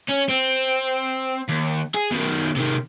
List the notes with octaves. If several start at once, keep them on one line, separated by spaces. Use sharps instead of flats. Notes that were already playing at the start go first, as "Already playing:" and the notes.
C#4
C4
D#2
G#4
B2 D#3
C3 D#3